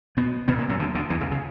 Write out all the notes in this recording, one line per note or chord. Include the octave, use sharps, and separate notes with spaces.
B2 B3
B2 B3
A#2 A#3
F#2 F#3
D2 D3
D2 D3
E2 E3
C#2 C#3
C#3